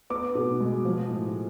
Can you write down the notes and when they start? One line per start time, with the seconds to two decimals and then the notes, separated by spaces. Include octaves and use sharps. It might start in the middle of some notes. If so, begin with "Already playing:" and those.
0.10 B3 D6
0.35 B2
0.60 G#3
0.85 F3
1.10 A2